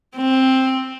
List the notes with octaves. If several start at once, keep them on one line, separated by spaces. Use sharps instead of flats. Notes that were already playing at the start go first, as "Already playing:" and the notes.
C4